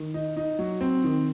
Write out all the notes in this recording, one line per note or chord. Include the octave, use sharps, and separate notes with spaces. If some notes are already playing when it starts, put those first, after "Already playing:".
Already playing: D#3
D#4
D#4
F#3
C4
D#3